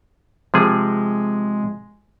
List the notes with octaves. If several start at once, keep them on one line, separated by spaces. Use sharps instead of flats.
C3 F3 G#3 G#4